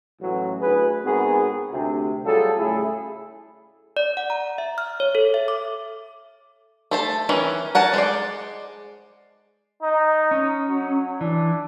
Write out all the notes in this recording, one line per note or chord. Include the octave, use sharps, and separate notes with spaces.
A1 F#3
D2 E4 G#4 B4
G#2 B3 C4 F#4 G#4 A#4
D2 C3
F#3 G3 F4 G#4 A4
A2 C#3 A3 E4 G#4
D5
F#5
A#5
E5
F6
C#5
A4
E5
D6
A3 C5 A5
D#3 E3 C#4
A#4 F#5 G#5 A5
G#3 C5 D5
D#4
C#4
F#3
E3 D4